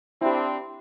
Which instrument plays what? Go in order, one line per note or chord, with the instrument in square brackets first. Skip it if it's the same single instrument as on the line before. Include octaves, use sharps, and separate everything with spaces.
[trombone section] C4 D4 [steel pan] E4 G4